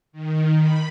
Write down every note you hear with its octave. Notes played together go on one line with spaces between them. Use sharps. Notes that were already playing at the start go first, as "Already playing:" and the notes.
D#3
B5